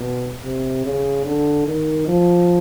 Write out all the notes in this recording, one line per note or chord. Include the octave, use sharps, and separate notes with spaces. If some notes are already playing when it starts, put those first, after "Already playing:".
Already playing: B2
C3
C#3
D3
D#3
F3